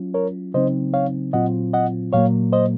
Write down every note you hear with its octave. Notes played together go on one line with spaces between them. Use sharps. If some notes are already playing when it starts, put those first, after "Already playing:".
Already playing: F#3 C#4 F4
A#4 C#5
C#3 F#3 C4 D#4 C5 D#5
C#5 F5
A#2 F#3 C4 F4 D#5 F#5
D#5 F#5
A#2 F#3 A#3 C#5 F5
C5 D#5